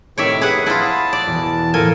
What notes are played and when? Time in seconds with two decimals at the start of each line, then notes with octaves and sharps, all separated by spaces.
0.18 A2 C3 D#3 C#5 D5 E5
0.41 G#4 B4 F#5 D#6
0.66 E4 F4 F#5 A5 B5 D#6
1.13 D5
1.27 E2 B2
1.74 A2 F3 A4 A#4 G#5